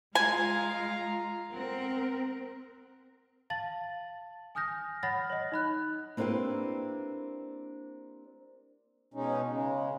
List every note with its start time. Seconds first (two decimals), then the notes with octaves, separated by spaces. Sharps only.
0.15 G#3 F4 F5 G#5 A#5
1.53 C4 A#4 F#5
3.50 F5 A5 A6 F#7
4.55 G#5 D#6 F6 G6 A#6
5.03 C#5 F#5 B5 F6 A6 A#6
5.30 C#5 D#5
5.52 D#4 B5 F#6
6.17 A#3 C4 D4 E4 G4 B4
9.14 B2 G#3 C#4 D#4
9.47 C#3 G#3